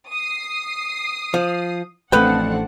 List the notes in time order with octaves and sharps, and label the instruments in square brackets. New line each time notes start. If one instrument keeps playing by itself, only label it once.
[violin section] D#6 C7
[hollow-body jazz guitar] F3
[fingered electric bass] A1 A3 [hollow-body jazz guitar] F2 B4 G5 [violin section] C4 D4 F#5